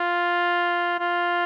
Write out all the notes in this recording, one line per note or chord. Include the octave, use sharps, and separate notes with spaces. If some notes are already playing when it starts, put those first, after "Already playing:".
Already playing: F4
F4